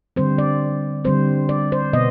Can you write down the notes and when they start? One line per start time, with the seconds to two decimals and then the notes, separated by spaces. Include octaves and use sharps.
0.16 D3 G3 C4 C5
0.38 D5
1.04 D3 G3 C4 C5
1.49 D5
1.72 C5
1.93 B2 B3 D#5